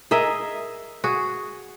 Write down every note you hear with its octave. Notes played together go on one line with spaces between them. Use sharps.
G#4 A#4 D#5 E5
F#4 G#4